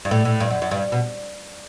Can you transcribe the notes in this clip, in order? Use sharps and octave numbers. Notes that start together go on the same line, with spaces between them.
G2
A2
A2
G2
F#2
F#2
G2
B2